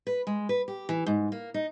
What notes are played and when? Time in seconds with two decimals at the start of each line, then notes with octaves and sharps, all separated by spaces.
0.07 B4
0.27 G#3
0.49 B4
0.68 G4
0.89 E3
1.06 G#2
1.32 A#3
1.54 D#4